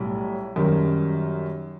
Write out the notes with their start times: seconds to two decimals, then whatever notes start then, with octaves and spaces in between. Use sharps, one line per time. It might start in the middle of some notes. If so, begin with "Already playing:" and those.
Already playing: B1 A2 G3
0.56 F#2 D#3 G3